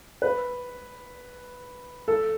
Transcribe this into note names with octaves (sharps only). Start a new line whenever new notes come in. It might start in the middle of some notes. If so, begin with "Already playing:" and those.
B4
A4